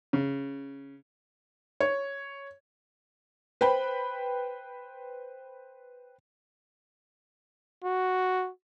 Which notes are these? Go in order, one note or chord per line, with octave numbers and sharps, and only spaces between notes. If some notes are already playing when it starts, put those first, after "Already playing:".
C#3
C#5
B4 C5 G5 B5
F#4